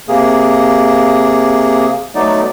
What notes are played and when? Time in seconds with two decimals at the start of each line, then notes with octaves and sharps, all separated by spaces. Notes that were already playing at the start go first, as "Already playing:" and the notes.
0.08 C3 A#3 G#4
2.15 F#3 A3 B3 D#4 D5